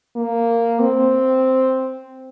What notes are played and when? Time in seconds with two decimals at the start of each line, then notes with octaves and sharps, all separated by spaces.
0.16 A#3
0.80 C4